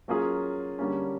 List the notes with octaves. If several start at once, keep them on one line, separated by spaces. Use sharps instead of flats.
F#3 A#3 C#4 F4 G#4
D3 G3 A#3 C#4